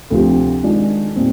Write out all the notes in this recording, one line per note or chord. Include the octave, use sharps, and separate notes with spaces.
D2 C3 F3 C4 G4
D#3 G#3 D4 F4
A#2 G3 C4